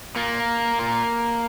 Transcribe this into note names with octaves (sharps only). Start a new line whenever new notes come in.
A#2 A#3
A#2